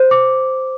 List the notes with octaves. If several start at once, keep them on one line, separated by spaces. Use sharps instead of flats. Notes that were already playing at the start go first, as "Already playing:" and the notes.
Already playing: C5
D6